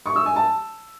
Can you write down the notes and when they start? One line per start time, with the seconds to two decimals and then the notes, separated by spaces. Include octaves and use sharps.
0.06 C#6
0.16 E6
0.26 G#5
0.36 A5